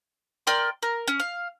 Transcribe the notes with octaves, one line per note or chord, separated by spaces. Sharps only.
A#4 D5 G5 C6
A#4
C#4
F5